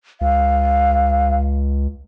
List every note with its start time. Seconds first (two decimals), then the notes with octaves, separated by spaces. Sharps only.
0.21 C#2 F5